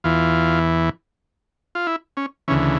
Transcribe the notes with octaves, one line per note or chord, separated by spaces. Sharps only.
E2 E3 F4
F4
E4
C#4
D2 C#3 E3 C#4